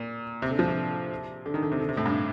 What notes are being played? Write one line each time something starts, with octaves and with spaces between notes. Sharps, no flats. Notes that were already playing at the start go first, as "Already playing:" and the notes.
Already playing: A#2
C3
D3
F3
C3
D3
D#3
D3
C3
D3
C3
A2
G2